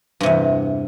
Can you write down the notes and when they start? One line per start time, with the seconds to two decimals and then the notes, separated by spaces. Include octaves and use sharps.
0.20 G2
0.23 C3
0.26 E2